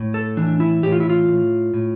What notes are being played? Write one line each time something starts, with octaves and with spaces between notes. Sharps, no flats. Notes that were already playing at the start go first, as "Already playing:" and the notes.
Already playing: A2
A4
E3 D4
E4
A2 G4
F4
E4
F4
A2
A2